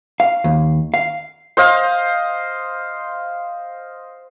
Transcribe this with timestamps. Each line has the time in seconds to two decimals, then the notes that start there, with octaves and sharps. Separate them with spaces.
0.20 F5
0.44 D#2
0.94 F5
1.57 C5 D#5 F5